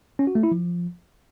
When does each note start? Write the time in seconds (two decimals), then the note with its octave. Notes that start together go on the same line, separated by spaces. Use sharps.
0.19 C#4
0.27 F#4
0.35 A3
0.43 E4
0.51 F3